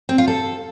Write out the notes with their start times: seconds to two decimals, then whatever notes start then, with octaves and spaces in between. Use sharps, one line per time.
0.09 C4
0.18 F4
0.28 A4